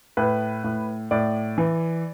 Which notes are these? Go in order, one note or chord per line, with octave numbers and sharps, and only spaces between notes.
A2 B4
A2
A2 D5
E3